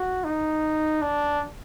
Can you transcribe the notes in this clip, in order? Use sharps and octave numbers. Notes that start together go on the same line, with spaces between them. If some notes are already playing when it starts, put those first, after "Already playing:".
Already playing: F#4
D#4
D4